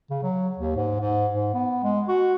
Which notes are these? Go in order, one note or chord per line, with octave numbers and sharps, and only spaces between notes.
C#3
F#3
D#2
G#2
G#2
G#2
B3
G#3
F#4